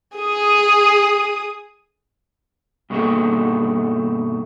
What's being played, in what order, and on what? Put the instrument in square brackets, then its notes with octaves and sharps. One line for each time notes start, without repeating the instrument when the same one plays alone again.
[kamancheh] G#4 D#6
[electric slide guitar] G2 B2 D#3 A3 A#3 G#4